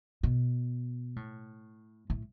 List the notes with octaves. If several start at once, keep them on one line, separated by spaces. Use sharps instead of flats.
B2
A2
A2